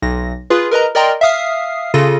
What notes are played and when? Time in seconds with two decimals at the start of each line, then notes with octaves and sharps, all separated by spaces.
0.02 B1 A#6
0.50 F4 G#4 B4
0.71 A#4 B4 D#5 A#5
0.95 A#4 D5 D#5 G5 A#5 C6
1.21 E5 F5 D#6 F6 C7
1.94 C#3 F4 A4 A#6 D#7